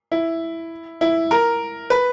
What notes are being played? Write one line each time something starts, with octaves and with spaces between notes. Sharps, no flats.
E4
E4
A#4
B4